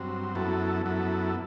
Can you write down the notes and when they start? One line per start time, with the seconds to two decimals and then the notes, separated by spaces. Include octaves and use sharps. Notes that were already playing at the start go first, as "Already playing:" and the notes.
Already playing: G2 F#3 C4
0.35 F#2 F#3 B3 E4 A4
0.85 F#2 F#3 B3 E4 A4